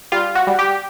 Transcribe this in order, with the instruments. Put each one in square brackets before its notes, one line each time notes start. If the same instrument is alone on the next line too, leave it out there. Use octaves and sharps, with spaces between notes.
[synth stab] G3 F4
F#4
G3
G4